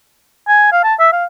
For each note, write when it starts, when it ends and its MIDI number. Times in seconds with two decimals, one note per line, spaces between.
0.48 0.68 80
0.72 0.79 77
0.84 0.94 81
0.99 1.09 76
1.12 1.25 77